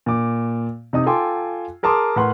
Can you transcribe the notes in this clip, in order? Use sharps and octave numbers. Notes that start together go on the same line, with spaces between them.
A#2 D6
C3 D#4 D#6
F4 A4 G5 G#5 C6 D6
G#4 A#4 A5 C6 D6 D#6
A2 A#4 B4 F#5 C6